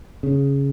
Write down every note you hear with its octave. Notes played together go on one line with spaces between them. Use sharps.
C#3